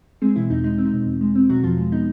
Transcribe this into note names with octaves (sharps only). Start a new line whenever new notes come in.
G#3 C4 G#4
B2 E3 E4
E2 D#4
G#3 D#4
C4
D#4
B2
E2
G#3
C4
B2 F#3 F#4
E2 F3 F4
G#3
B3 D#4